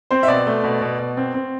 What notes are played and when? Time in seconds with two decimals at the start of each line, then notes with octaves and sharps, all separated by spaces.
0.11 C4 C5
0.23 E5
0.28 B2 D5
0.47 A3
0.64 B2
0.81 B2
0.99 B2
1.17 C4
1.34 C4